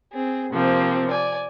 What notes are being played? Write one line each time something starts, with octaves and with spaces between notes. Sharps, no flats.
C4 G#4
C3 F3 A#3 C4
D5 G#5